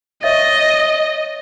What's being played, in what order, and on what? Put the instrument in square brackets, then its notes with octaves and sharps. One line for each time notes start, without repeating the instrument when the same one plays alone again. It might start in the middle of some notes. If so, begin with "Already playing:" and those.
[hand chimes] C#5 E5 A6 [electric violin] D#5